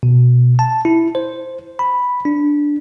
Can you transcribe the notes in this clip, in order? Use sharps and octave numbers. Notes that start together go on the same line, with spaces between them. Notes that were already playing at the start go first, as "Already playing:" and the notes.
B2
A5
E4
C5
B5
D4